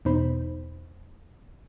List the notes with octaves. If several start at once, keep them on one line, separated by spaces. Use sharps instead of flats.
E2 B2 D#4 C5 B5